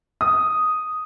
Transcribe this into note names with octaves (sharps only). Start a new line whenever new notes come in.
D#6